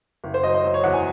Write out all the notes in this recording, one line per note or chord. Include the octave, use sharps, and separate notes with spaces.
F#1
C5
F#3 D#5
D#5
F#3
C#5
E2 F#5
G#5